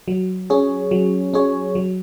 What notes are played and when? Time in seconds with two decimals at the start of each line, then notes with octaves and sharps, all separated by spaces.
0.08 F#3
0.50 C#4 G#4 C#5
0.91 F#3
1.34 C#4 G#4 C#5
1.75 F#3